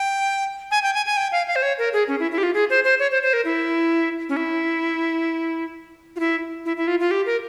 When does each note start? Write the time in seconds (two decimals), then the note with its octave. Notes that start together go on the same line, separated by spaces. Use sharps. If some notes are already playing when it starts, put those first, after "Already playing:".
Already playing: G5
0.71 G#5
0.83 G5
0.94 G#5
1.06 G#5
1.17 G5
1.32 F5
1.47 F5
1.56 C5
1.63 C#5
1.78 A#4
1.93 G#4
2.08 C#4
2.20 E4
2.31 E4
2.38 G4
2.43 F4
2.54 G#4
2.70 C5
2.84 C5
2.99 C#5
3.11 C5
3.23 C5
3.33 A#4
3.45 E4
4.29 C#4
4.37 E4
6.16 F4
6.20 E4
6.65 E4
6.77 E4
6.87 F4
7.00 F4
7.11 G4
7.26 A#4